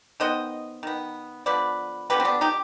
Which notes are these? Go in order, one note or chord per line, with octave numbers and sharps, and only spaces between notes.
D#3 B3 C5 D#5
D#3 B3
D3 F3 B3 B4 D5
D3 F3 B3 G4 B4
C4
B3 D4
D#4 G4